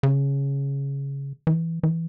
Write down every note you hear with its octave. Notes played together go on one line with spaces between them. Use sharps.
C#3
E3
E3